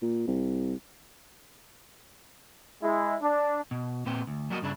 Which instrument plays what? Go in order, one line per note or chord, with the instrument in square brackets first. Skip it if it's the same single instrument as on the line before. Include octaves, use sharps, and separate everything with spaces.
[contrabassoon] A#2
C2
[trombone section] G#3 E4
D4
[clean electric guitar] B2
A#2 B3 C4 G5
D2
F#3 G3 A#3 F#4 A4 D#5
G2 C#3 D4 E4